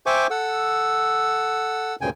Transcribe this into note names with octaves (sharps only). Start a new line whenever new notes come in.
C5 E5 G5 G#5 C#6 D6
A4 F#5 E6
D2 G2 A#2 C#3 G5 G#5